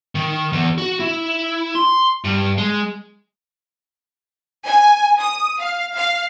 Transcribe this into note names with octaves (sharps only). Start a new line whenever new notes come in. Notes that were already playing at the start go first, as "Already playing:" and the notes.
D#3
E2
F#4
E4
C6
G2
G#3
G#5
D#6
F5
F5